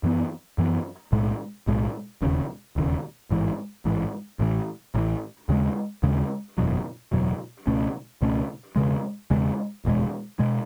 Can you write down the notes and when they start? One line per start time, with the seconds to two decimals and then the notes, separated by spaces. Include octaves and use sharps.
0.03 F#2 E3 B3
0.58 F#2 E3 B3
1.12 B1 A2 G#3
1.67 B1 A2 G#3
2.22 E1 D#2 C#3
2.76 E1 D#2 C#3
3.30 A1 G#2 E3
3.85 A1 G#2 E3
4.39 A1 A2 E3
4.94 A1 A2 E3
5.49 D#2 C#3 G#3
6.03 D#2 C#3 G#3
6.58 F#1 E2 B2 F#3
7.12 F#1 E2 B2 F#3
7.67 C#2 B2 A3 C#4
8.22 C#2 B2 A3 C#4
8.76 E1 E2 C#3 G#3
9.30 E1 E2 C#3 G#3
9.85 F#1 E2 B2 G#3
10.39 B2 G#3